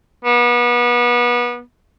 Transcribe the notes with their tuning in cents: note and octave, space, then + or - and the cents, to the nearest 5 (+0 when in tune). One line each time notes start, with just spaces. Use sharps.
B3 -30